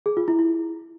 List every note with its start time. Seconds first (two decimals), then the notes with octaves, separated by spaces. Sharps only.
0.06 G#4
0.17 F4
0.28 E4
0.39 E4